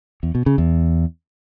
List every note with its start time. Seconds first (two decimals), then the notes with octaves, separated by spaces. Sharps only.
0.23 E2
0.35 B2
0.46 C#3
0.58 E2